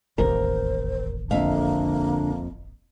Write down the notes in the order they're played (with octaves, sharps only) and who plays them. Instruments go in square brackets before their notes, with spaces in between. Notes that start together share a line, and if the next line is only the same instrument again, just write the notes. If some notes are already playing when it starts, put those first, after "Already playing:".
[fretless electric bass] E1 A1 D#2 [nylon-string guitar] A#4 [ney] C5
[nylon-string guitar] F2 E5 F5 [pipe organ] D3 D4 [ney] A#3